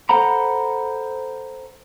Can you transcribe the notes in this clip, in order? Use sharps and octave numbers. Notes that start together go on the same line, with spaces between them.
A4 C5 F#5 A#5 B5